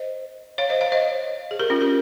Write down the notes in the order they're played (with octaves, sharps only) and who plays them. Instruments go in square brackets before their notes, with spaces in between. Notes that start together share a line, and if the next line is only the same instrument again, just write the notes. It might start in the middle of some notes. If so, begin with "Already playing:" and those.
Already playing: [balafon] C5 D#5
C#5 F5
C5 D#5
C#5 F5
C5 D#5
G#4
G4 A#4
C#4 F4
G4 A#4